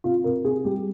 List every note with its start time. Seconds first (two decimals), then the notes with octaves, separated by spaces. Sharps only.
0.04 C3 F4
0.24 C3 A#4
0.45 C3 G#4
0.65 G3 G4